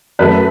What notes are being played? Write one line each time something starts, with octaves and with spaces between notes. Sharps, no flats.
F#2 F#3 A3 B4